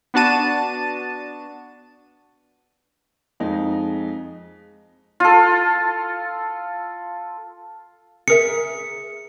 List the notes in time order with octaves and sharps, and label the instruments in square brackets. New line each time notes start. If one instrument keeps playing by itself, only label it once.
[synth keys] B3 D4 F#4 A5 D#7
[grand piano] F2 G#3 D#4
[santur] F4 A4
[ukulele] G#4 A#4 E5 [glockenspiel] C#7